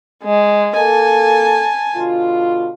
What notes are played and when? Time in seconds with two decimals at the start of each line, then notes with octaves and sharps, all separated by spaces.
0.23 G#3
0.77 A#3 A4 G#5 A5
1.95 B2 D3 F4